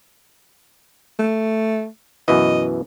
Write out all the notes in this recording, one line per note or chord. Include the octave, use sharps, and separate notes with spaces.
A3
F#2 B2 E3 D#5